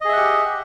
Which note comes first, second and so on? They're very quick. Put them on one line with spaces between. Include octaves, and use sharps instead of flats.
D#5 G#4 E5 F#5 G4